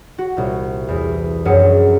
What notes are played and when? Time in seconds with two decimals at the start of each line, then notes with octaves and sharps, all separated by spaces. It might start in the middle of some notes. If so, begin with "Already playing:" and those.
0.18 F#4
0.37 C2 A#2
0.88 E2
1.45 A#1 F#2 C4 C#4 G#4 C#7